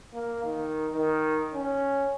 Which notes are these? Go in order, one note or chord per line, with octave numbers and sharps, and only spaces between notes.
A#3
D#3
D#3
C#4